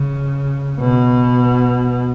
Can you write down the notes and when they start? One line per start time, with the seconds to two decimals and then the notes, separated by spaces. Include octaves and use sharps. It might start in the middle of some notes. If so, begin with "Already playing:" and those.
Already playing: C#3
0.80 B2